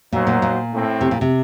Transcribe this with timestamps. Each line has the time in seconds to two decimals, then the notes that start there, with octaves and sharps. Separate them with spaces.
0.12 A#2 F#3 A#3 D#4 F#4 C5
0.27 A#2
0.42 A#2
0.71 A2 A3 C4
1.01 C3
1.11 A#2
1.21 C3